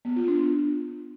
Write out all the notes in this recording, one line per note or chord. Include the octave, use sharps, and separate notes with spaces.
B3
F4
D4